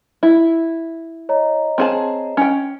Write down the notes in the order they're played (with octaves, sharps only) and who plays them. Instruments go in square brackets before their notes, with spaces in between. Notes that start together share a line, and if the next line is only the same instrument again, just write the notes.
[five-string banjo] E4
[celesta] C#5 D#5 A#5
[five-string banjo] C4 G#4 A5
C#4 G5